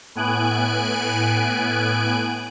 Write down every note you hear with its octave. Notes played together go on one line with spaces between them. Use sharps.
A2 B3 G#5 F#6 D7